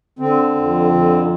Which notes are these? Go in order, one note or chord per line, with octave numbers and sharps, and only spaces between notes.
D3 C4
F2
D3